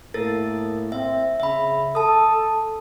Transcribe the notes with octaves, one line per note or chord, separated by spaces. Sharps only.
A2 A#3 A4 A#4 A6
C4 E5
C#3 E5 B5
A4 A5 D#6